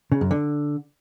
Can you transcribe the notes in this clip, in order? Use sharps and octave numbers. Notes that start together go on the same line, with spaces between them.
C#3
F#2
D3